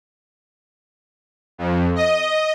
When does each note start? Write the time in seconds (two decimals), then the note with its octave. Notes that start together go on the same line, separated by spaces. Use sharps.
1.58 F2
1.96 D#5